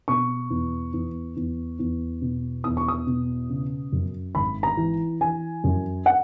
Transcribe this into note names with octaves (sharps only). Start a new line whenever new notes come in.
B2 C#6
E2
E2
E2
E2
B2
E2 D#6
C#6
D#6
B2
C#3
F#2
G#1 B5
A#5
E3
E3 G#5
F#2
F#5